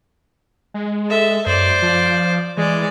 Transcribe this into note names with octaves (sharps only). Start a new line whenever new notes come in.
G#3
A4 E5
F#2 C5 D5
F3
E3 G#3 D5